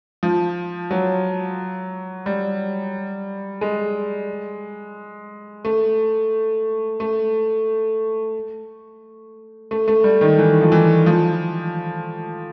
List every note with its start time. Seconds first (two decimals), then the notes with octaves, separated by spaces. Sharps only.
0.23 F3
0.91 F#3
2.26 G3
3.61 G#3
5.65 A3
7.00 A3
9.71 A3
9.88 A3
10.04 G3
10.21 D#3
10.38 E3
10.61 F3
10.72 E3
11.06 F3